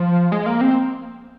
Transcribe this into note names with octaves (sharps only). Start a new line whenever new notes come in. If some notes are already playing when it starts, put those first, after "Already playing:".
Already playing: F3
G#3
A#3
C4